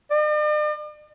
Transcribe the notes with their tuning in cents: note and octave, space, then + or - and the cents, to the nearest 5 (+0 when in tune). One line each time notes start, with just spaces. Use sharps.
D5 +45